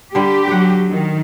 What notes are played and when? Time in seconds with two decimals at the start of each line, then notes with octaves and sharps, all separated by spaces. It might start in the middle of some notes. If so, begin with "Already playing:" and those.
0.15 D3 G3 G4
0.48 F#3 F#5 G5
0.91 D#3